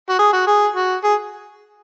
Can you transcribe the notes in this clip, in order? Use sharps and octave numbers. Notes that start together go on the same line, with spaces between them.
F#4
G#4
F#4
G#4
F#4
G#4